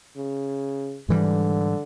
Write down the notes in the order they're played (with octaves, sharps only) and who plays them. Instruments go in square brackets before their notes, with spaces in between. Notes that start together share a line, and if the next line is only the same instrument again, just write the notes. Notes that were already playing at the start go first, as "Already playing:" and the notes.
[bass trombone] C#3
[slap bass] G#2 E3 G3 [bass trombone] D3